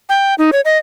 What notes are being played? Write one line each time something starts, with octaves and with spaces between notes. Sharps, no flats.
G5
D#4
C#5
D#5